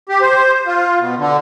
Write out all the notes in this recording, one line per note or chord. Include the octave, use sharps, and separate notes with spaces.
G4
C5
F4
B2
D3